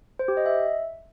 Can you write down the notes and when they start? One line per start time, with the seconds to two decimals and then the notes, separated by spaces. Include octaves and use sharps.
0.19 C5
0.28 G4
0.37 D#5
0.46 E5